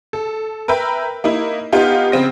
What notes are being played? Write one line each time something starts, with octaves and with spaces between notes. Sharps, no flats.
A4
A#4 B4 E5 G5 B5
A#3 D#4 E4
B3 D#4 F4 G4
C#3 C4 A#6